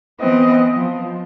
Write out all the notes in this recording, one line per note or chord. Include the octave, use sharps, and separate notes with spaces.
E3 B3 C4 D#5
F3